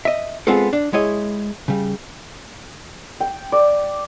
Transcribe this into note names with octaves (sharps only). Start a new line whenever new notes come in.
D#5 E5
G#3 B3 C4 F4 A4
D4
G#3 E4 C#5 D#5
C#3 G3
G5
D5